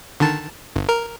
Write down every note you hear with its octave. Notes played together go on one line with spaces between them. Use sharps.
D3 D#3 A5
G1
A#4